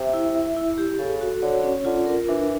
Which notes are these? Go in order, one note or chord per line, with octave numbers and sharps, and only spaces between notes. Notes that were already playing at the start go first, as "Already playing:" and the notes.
Already playing: C3 E5
E4
E5
E4
G4
C#3 A4
F#4
D3 C#5
C#4
D3 F4
A#4
E3 D4